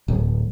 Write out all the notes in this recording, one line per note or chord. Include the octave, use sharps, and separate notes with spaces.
D1